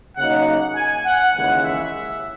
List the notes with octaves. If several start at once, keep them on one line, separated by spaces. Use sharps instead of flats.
C#3 F#3 A#3 D#4 F#5
F#5
G#5
F#5
D#2 C#3 E3 G#3 F#5
E5